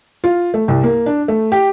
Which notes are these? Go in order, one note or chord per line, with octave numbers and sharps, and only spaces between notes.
F4
A3
C2
A#3
D4
A3
G4